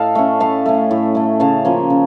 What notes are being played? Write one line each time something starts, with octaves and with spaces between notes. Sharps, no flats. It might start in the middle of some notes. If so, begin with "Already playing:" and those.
Already playing: A2 A4 D#5 F5 A5
A3 C#4
A2 F5 A5
A3 C#4
A2
A3 C#4
C#3 F5 A5
F3 A#3 C#4
C#3